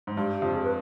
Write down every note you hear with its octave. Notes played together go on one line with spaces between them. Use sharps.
G#2
G2 G4
F2
G#4
B4